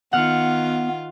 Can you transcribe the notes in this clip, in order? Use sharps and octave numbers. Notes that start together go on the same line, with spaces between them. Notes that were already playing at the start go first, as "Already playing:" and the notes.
D#3 B3 F4 F#5 F6 C#7